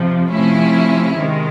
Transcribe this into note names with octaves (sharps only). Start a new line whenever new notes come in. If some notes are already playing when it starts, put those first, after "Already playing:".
Already playing: F2 C3 F3
C3 F3 A3 C#4 E4
C3 D#3 G#3